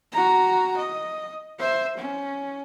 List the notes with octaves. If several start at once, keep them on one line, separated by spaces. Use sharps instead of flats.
F#4 A#5
D#5
C5 E5
C#4